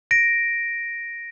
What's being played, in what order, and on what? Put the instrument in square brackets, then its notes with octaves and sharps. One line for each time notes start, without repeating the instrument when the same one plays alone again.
[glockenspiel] A#6 D7